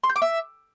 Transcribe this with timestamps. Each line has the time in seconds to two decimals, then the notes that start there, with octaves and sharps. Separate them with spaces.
0.04 C6
0.10 G6
0.16 D6
0.22 E5